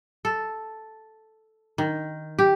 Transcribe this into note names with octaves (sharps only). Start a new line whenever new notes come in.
A4
D#3
G4